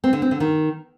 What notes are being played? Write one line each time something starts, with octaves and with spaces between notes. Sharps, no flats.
C4
D3
C4
D3
D#3